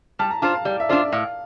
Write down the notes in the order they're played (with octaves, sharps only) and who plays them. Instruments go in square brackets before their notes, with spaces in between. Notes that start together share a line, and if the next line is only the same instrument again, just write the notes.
[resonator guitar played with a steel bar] G3 [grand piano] A5
[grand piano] A#5
[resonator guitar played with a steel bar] D4 F4 C5 [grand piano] A5
[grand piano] F5
[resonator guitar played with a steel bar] G3 [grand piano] D5
[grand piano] E5
[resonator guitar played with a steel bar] D4 F4 C5 [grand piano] D5
[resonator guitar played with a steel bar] A2 [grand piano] F5